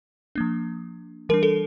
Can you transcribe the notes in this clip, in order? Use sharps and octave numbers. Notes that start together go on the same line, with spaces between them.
F3 A#3 D4
E3 G3 D4 A#4
A4